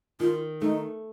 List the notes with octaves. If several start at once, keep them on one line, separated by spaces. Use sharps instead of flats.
D#3 F4
A3 D#4